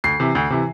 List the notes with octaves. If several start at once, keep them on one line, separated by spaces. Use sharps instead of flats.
D2 C7
C3 E3
D2
C3 E3